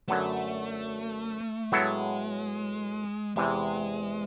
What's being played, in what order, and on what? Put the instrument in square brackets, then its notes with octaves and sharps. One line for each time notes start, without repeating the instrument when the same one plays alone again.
[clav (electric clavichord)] F#2 D3 F#3 B3 [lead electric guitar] A3
[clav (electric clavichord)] A2 F#3 B3 E4 A4 [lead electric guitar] G#3
[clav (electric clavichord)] E2 C3 E3 [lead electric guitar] G#3